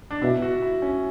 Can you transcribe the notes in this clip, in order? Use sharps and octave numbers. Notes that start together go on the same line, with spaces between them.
D4
B2 E4
F#4
E4
C#4